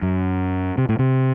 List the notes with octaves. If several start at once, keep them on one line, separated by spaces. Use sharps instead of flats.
F#2
C3
A2
C3